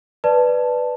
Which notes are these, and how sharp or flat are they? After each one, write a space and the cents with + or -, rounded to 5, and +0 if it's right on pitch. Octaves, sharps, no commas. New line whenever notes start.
B4 +0 D5 +10 A5 +0